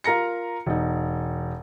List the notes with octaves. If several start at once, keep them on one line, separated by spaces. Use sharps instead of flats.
F4 A#4 A#5 A#6 C#7
E1 D#4